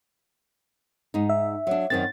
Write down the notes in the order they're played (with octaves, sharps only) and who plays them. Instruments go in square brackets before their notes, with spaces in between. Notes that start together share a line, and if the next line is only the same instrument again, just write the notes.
[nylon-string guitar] G#2 D#4
[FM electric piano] E5
[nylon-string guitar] F#3 D4
[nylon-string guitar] F#2 D#3 C4 [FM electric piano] A6